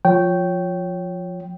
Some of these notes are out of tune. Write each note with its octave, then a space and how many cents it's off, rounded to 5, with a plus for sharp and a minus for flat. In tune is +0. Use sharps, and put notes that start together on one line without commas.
F3 +10 C#5 +0 G5 -15